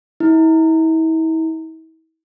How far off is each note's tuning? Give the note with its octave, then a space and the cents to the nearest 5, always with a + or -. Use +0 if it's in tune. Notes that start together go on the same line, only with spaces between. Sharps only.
E4 -40